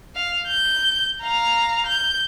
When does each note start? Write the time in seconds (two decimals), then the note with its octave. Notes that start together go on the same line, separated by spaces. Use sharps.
0.16 F5
0.47 G6
1.21 F5 A#5
1.87 G6